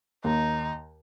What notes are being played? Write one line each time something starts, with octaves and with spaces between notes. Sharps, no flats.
D#2 D#4